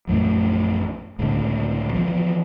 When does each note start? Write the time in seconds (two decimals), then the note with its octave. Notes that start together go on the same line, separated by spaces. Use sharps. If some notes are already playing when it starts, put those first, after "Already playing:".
0.07 A#1 F#2 E3 A3
1.19 C#2 A2 D3 G#3
1.93 E3 F3 B3